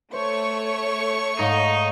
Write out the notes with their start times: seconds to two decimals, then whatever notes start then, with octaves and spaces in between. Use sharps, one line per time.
0.13 A3 C5 C#5 C#6
1.39 G#2 D#4 F5 D#6